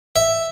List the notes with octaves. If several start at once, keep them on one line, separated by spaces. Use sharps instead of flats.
E5